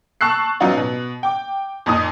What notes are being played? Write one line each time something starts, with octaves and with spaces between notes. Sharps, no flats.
A5 C#6 E6 F#6 C7
F#3 B3 C#4 D#4 F4 D5
B2
G5 D6
F2 A#2 D#4 D#6